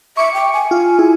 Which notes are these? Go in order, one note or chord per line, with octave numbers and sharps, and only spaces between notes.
E5 C#6 D6 C#7
G5
G#5
F4
E4 G#4